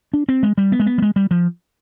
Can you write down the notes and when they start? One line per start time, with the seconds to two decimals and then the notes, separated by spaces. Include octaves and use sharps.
0.13 D4
0.29 C4
0.43 G#3
0.58 G3
0.72 B3
0.80 G#3
0.86 B3
0.98 G3
1.02 G#3
1.16 G3
1.31 F3